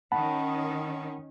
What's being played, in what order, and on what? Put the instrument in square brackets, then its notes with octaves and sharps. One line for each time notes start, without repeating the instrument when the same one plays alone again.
[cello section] D#3 C#4 [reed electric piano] F#5 A5 B5